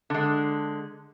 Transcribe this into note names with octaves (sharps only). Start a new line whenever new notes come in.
D3 G#3